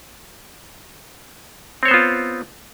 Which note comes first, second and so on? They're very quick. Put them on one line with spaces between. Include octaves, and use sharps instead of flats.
C4 C#5 C5 B3 F4